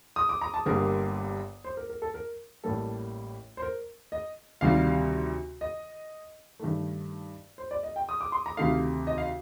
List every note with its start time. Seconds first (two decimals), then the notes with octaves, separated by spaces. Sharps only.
0.16 D#6
0.29 D6
0.41 A#5
0.54 A5
0.66 G1 G2 D3 G3 A#3 A#4
1.64 C5
1.77 A#4
1.90 A#4
2.02 A4
2.14 A#4
2.64 A1 A2 G3 A#3 A4
3.57 C5
3.62 A#4
4.12 D#5
4.61 D2 C3 D#3 G3 F5
5.61 D#5
6.59 G2 D#3 A3
7.58 C5
7.71 D5
7.83 D#5
7.96 G5
8.09 D#6
8.21 D6
8.32 C6
8.46 A#5
8.57 D2 C3 D#3 A3 F5
9.07 D#5
9.18 F5